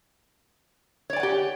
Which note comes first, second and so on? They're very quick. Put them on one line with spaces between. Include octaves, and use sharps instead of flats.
C#5 D5 G#5 F#5 G4